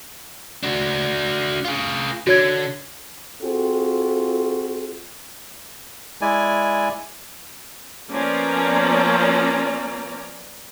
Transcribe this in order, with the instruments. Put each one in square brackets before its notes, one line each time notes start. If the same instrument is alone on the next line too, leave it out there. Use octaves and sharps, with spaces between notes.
[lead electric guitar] D4 F#4
F4 G#4
[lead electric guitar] D3 [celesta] F#4 C#5 G#6
[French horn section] C4 F4 F#4 G#4 A4
[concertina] G#3 E4 D5 G#5
[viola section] F3 A#3 B3 C#4 D5 A#5